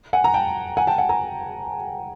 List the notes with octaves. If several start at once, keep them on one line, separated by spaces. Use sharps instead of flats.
F#5 G#5
G#5 A#5
G5 A5
F#5 G#5
G5 A5
F#5 G#5
G#5 A#5